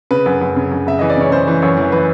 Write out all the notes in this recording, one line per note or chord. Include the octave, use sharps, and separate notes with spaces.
C#3 B4
F#2
F#2
C#3
F#2
C#3 E5
E3 D#5
D5
C#3 C#5
C#3 C5
E3
F#2 C#5
E3
E3 B4